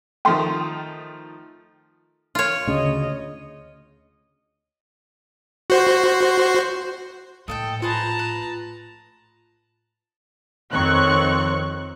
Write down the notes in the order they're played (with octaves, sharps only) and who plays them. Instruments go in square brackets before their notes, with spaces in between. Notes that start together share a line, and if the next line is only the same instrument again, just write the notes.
[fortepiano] D#3 F3 A3 [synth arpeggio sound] G5 C6
[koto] F4 C#5
[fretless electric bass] D2 C#3 [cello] D#5
[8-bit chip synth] F#4 C5
[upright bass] A#1 A2 [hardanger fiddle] A4 [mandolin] D#5 F5 G5
[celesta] F4 [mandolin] G#4 B4 C5 [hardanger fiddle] A5 A#5
[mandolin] B4
[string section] F2 D#3 C4 C#5 C#6 F#6